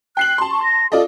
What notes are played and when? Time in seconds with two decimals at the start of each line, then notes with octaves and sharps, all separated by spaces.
0.17 G5 F#6 C7 F#7
0.38 A5 C6
0.51 C#6
0.64 A#6
0.92 F4 A4 D5 D#5